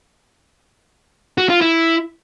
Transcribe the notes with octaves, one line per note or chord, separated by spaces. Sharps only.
F#4
F4
E4